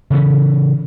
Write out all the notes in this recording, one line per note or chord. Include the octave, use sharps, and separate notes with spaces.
C#3 E3 C#4